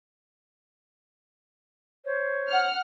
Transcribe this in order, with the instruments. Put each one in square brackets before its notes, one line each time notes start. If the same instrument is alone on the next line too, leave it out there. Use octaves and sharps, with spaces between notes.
[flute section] C5 C#5
[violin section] F#5 F6